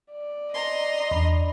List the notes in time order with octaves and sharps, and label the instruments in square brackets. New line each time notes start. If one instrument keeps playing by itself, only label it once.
[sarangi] D5
[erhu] D#5 [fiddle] A#5 C6
[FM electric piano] E2 B5 [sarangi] D4